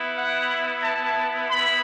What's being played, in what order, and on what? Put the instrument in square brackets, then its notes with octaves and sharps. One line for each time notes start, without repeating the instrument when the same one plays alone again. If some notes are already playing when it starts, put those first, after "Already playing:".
Already playing: [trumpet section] B3 E4
F#5
A5
B5